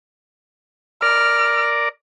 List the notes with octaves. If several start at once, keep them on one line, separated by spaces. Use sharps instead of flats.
A#4 D5 F6